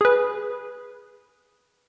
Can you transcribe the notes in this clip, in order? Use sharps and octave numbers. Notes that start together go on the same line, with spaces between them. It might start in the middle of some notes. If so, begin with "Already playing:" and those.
G#4 B4